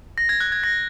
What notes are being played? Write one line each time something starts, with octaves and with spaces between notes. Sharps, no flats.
A#6
G#6
F#6
G#6
A#6